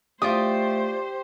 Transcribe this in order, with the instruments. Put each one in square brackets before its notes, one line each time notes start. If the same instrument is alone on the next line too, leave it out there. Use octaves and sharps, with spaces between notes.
[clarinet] A3 [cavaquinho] F4 D5 D#6 [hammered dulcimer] G4 [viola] C5